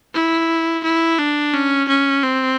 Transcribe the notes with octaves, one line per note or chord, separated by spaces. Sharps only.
E4
E4
D4
C#4
C#4
C4